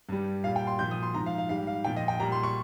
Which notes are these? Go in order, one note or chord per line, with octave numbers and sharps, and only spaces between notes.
G2 G3
A#2 G3 F5
G5
C6
A#2 F3 G6
D#6
C6
G#2 F3 A#5
F5
F5
G#2 G3 F5
F5
A#2 F3 G5
D#5
G5
A#2 G3 A#5
C6
C#6